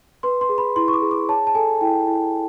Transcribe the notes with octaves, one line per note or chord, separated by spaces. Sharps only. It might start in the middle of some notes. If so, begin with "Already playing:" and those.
B4 C6
C6
G#4
B5
E4 C6
C#6
D6
G#4
D6
C#5 A5
A5
A4 G#5
E4 G5
E4